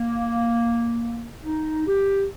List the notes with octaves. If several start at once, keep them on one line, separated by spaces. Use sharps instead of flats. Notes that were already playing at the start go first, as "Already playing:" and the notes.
Already playing: A#3
D#4
G4